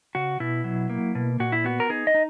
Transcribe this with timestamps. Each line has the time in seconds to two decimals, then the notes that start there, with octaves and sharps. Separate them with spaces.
0.15 C#3 F#4
0.40 B2 E4
0.64 F#3
0.90 A#3
1.15 B2
1.40 A#2 F#4
1.52 E4
1.64 B3 F#4
1.80 A#4
1.89 D#4 G#4
2.07 D#5
2.14 D#4